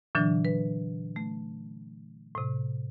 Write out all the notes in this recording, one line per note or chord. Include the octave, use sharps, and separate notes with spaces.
A#2 D3 E3 F#3 D4
B4
A3
A2 C3